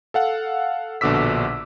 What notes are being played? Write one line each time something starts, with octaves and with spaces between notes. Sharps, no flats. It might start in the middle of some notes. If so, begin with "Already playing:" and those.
A4 F5 F#5
A#1 B2 D3 D6 E6 B6